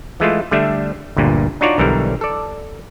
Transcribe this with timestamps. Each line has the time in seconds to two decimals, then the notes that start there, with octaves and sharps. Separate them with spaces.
0.20 E3 G#3 A3 F4
0.51 D3 G3 A3 D4 E5
1.16 G1 D2 G2 A#2
1.61 D4 D#4 F4 F#4 C#5 D5
1.78 B1 D3 E3 G3 A#4
2.21 A4 D5